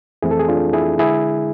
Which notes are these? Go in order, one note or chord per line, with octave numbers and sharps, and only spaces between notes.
F2 E3 A3 C4 E4 G#4
A4
G#4
D4 F4
E4 G#4
D3 G#3 E4 G#4